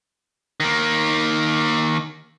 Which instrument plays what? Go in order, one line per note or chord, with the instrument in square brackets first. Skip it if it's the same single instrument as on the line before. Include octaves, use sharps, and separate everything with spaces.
[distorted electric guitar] D#3 A#3